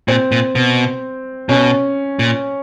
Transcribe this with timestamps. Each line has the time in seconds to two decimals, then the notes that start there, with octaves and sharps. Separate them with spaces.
0.08 A#2 C4
0.32 A#2
0.55 B2
1.49 B2 C#4
2.19 A#2